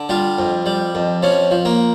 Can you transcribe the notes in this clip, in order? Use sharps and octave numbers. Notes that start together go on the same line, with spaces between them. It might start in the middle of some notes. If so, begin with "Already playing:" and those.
Already playing: D3
G3 F4
F2
G3
F2
F3 C#4
F3
A#3